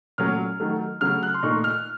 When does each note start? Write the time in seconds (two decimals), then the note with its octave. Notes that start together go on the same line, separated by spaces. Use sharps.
0.18 A#2 F#3 A3 C#4 F6
0.60 D#3 F#3 A3
1.01 C#3 F#3 A3 F6
1.23 F#6
1.34 C6
1.43 A#2 A3 D#4 C#6
1.64 F6